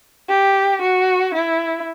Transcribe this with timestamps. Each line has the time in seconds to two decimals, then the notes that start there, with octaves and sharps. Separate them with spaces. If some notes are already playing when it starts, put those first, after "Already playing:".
0.29 G4
0.82 F#4
1.34 E4